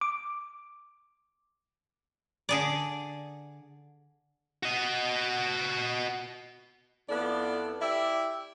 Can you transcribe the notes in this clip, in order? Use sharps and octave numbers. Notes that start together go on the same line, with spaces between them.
D6
D3 G#4 D5
F#4 D#5
F2 B3 E4 F4 A4 D5
E4 G4 D5 E5